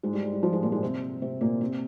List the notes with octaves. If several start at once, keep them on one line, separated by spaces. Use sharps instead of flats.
G#2 G#3
G3
G3
G3
F3
G#2 G#3
A#2 A#3
G#2 G#3
C3 C4
C3 C4
A#2 A#3
C3 C4